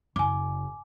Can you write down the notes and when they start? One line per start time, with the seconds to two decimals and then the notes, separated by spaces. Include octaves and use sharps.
0.16 F#1 G#5 D6